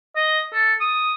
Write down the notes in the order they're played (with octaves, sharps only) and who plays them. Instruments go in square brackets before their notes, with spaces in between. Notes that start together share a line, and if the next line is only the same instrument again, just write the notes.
[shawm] D#5
A4
D#6